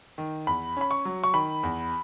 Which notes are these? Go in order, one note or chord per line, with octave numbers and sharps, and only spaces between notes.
D#3
E2 B5
C#4 B5
C#6
F#3
C#6
D#3 B5
E2